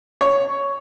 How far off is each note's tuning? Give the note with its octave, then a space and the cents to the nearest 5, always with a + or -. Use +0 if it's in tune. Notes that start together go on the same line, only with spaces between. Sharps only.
C#5 +5